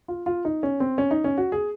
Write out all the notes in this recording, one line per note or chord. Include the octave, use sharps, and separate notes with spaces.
F4
F4
D#4
C#4
C4
C#4
D#4
C#4
F#4
G#4